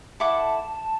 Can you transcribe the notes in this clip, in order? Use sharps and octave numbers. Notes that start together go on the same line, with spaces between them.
E4 A4 F#5 A5 D6